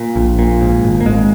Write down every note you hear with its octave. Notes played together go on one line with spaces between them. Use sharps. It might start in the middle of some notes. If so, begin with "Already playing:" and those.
Already playing: A#2
A#1
A#2
G#2
G#1
A#3
G#1 G#3